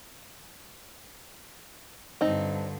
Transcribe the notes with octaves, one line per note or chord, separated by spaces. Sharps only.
G2 D3 C4 D#4